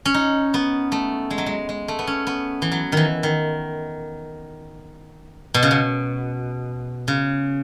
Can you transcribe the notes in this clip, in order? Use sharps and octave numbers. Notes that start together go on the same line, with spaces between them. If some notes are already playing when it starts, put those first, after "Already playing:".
C#4
D#4
B3
A3
G#3
F#3
G#3
G#3
A3
B3
C#4
B3
E3
F#3
D#3 E3
D#3
B2
C#3
B2
C#3